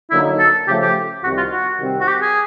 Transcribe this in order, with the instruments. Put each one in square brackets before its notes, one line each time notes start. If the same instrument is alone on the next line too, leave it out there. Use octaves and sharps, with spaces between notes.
[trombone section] D3 F#3 A#3 D#4 [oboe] E4
[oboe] A4
[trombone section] C#3 F3 A3 [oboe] G4
[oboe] G4
[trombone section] C2 C3 D#3 G3 [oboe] F#4
[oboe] F4
F#4
[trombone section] C3 D#3 G3 C4
[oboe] F#4
G4
G#4